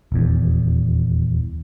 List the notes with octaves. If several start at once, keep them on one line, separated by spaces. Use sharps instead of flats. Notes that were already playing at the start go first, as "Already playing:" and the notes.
D#1 E2